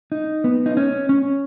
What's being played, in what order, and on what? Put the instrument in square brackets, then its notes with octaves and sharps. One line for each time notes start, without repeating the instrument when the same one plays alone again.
[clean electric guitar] D#4
B3
D#4
C#4
C#4